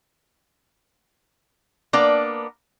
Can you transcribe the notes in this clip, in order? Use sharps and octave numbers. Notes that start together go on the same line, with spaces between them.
A#3 B3 D4 D5